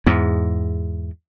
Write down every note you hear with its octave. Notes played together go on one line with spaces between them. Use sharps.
E2 G#2